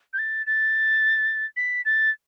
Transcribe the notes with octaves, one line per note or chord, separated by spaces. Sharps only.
G6
A6
A6
B6
A6